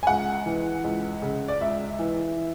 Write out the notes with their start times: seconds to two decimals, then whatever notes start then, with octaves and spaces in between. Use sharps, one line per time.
0.03 G#5
0.07 C#2 F#5
0.46 E3
0.84 C#2
1.22 C#3
1.48 D5
1.61 C#2 E5
1.99 E3